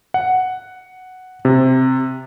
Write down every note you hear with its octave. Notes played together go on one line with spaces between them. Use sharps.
F#5
C3